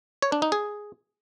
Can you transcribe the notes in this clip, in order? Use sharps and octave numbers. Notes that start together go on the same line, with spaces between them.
C#5
D4
D#4
G#4